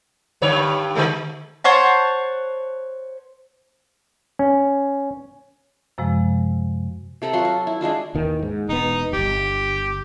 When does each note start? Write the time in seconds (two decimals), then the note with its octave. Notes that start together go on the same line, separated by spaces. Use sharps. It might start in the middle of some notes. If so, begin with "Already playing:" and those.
0.42 G2 D3 C#5
0.95 D3 G#3 A3
1.64 C5 C#5 F#5 A5
4.39 C#4
5.98 F#2 C3 F3 G#3
7.22 C3 A4 A#5 B5
7.33 F#3 F4 F#4 C6
7.45 F#4
7.67 E4
7.81 G#3 D4 E4 F4
8.15 D#2 D#3 E3
8.43 G#2
8.69 E1 B3 D#4
9.13 D1 G1 G4